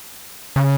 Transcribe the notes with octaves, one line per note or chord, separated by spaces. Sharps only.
C#3